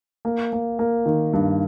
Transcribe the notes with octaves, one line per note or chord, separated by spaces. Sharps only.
A#3
A#3
A#3
D#3
G2